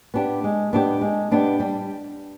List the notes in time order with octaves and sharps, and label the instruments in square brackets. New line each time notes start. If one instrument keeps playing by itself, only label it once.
[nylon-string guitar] B3 D4 G4
G#3
B3 D4 G4
G#3
B3 D4 G4
G3